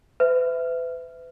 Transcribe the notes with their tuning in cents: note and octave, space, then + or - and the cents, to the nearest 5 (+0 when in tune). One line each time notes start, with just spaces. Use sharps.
B4 +40 E5 +0